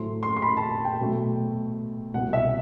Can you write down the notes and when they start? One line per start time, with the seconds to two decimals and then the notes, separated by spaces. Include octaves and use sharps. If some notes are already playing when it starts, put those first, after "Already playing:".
Already playing: A2 F#3 A3 C4 C6
0.23 C6
0.37 C6
0.42 B5
0.57 A5
0.71 A5
0.85 G5
0.99 B2 F#3 A3 C4
2.14 C2 B2 G3 F#5
2.33 E5